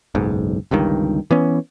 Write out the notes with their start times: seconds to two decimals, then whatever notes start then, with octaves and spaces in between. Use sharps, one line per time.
0.15 F#1 B1 G#2
0.71 G1 C#2 G2 D#3
1.31 E3 B3 C#4